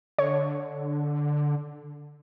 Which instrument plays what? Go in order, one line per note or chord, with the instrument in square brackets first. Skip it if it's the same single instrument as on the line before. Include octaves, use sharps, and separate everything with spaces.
[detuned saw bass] D3 [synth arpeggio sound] C#5